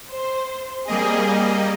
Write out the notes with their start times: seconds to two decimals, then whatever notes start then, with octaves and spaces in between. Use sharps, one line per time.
0.10 C5
0.88 G3 A#3 C4 G#4 D#5